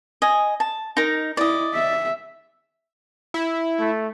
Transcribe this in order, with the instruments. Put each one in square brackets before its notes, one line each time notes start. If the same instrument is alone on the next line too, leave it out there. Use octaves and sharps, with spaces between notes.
[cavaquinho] D#5 G#5
A5
D#4 A#4
[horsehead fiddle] E4 [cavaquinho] D5 D#5
[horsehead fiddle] E5
[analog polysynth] E4
[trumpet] A3